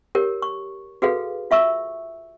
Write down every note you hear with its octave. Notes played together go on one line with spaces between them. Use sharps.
G4 A#4 C#5
C#6
F#4 G#4 A4 B4 F5
F4 E5 C#6 E6